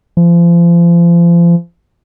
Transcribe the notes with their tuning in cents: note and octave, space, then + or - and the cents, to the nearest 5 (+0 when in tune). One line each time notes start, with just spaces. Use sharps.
F3 -35